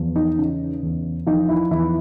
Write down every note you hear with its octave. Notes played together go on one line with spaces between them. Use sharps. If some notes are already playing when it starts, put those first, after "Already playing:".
Already playing: E2 F3
D#4
C#3
E2
F3 D#4
E4
E2 E4